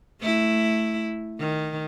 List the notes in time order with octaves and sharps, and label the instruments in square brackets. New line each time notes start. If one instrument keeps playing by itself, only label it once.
[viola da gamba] A3 E4
D#3